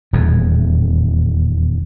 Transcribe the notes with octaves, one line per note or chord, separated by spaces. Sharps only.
D#1 E2